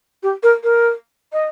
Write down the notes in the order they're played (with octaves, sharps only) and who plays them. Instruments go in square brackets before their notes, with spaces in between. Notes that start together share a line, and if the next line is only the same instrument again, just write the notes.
[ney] G4
A#4
A#4
D#5